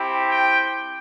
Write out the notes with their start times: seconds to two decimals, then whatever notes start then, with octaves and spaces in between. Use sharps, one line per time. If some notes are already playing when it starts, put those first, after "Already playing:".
Already playing: C4 E4 G4
0.29 G5